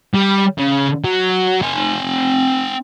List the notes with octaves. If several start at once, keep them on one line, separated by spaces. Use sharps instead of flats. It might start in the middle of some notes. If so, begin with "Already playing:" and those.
G3
C#3
F#3
C4 G#5